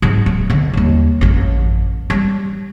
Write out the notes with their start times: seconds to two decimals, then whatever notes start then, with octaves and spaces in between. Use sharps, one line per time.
0.02 G#2 F#3
0.26 D1
0.50 B1 D3
0.73 D#2 G3
1.21 A1 F#2
2.10 G3